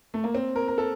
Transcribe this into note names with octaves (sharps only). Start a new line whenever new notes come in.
A3
A#3
C4
A#4
A#4
A4